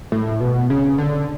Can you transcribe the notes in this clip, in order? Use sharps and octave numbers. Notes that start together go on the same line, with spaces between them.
A2
B2
C#3
D3